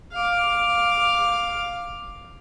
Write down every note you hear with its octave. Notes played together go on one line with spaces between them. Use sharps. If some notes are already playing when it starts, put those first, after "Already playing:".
F5 D6